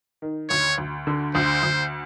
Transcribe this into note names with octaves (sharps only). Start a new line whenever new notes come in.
D#3
D2 C#5
D2
D3
D2 C5
D2